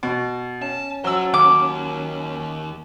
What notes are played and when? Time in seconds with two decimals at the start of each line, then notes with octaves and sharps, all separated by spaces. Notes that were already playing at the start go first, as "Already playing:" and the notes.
0.03 B2
0.62 C#4 A5
1.04 F#3 C5 A5 E6
1.34 D#2 D6